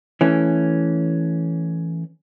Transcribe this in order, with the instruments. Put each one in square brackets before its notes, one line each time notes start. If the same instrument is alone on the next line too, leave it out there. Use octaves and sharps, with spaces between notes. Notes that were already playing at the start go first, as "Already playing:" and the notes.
[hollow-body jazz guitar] E3 A3 C#4